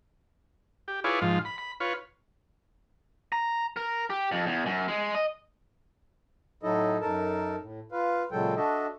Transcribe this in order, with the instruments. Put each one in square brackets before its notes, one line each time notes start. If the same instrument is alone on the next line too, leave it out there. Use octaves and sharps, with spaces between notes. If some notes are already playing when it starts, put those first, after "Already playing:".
[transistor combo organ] G4
E4 F4 G#4 B4 C#5 D5
G#2 F3 F4
B5
B5
F4 B4 C#5
[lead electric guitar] A#5
A#4
G4
F2
E2
F#2
G#3
D#5
[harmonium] A2 F#3 D#4 E4 A4 D#5
F#2 D#4 A4 A#4 A5
A2
F4 B4 F5
A#2 C#3 F#3 G#3 A4 G5
D4 F#4 A4 D#5 E5